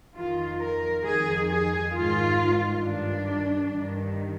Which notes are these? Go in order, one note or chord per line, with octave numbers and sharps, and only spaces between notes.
F2 D#3 F4
A#4
F2 D#3 G#4
G#4
G#2 D#3 F4
G2 D#3 D4
G2 D#3